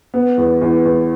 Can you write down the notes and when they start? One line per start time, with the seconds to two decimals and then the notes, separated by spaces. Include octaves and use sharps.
0.14 B3
0.38 E2
0.61 E2
0.85 E2